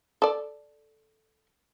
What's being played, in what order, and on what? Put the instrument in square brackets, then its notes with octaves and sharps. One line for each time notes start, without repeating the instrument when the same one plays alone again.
[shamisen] A4 D5